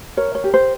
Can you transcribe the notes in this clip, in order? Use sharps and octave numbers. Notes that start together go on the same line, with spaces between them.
A#4 C#5
C#5
G4
C5